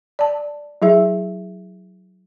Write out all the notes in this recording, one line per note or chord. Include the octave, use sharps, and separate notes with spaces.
D5 A5
F#3 E4 G#4 E5